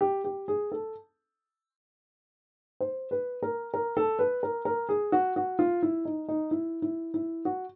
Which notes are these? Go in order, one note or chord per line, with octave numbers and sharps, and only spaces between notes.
G4
G4
G#4
A4
C5
B4
A#4
A#4
A4
B4
A#4
A#4
G#4
F#4
F#4
F4
E4
D#4
D#4
E4
E4
E4
F#4